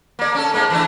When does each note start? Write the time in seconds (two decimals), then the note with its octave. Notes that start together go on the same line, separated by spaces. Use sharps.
0.19 A#3 D5
0.35 C#4 A4
0.54 G#2 G#3 A#3
0.70 E3 A3 D4